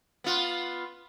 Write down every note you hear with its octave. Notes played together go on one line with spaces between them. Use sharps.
B3 F4